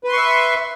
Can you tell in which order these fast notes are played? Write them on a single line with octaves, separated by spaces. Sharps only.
B4 C6 C#6 E5